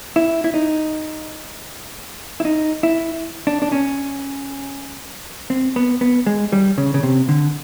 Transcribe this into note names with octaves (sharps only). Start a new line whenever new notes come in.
E4
E4
D#4
E4
D#4
E4
D4
D4
C#4
C4
B3
B3
G#3
G3
C#3
C#3
C3
D3